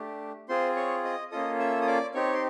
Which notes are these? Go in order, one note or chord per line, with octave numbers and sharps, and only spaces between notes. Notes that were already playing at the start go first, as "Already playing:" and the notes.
Already playing: A3 D4 G4
C4 F4 G#4 C5 C6
C#5 C#6
D#5 D#6
A#3 C#4 F4 A4 D#5 D#6
E5 E6
D#6
D5 D6
C4 D#4 G4 C#5 C#6
C6